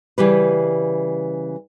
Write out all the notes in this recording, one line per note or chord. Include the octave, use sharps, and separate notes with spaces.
C#3 E3 G3 B4